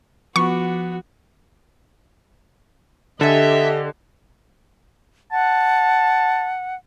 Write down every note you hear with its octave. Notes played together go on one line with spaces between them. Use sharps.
F3 B3 F#4 C#6 D6
D3 G4 A4 D#5 E5 G#5
F#5 A5